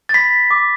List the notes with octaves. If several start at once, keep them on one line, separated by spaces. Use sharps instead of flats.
A6
B5 B6
D6